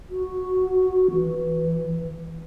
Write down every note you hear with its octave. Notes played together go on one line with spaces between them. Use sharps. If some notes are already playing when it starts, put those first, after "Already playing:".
F#4
E3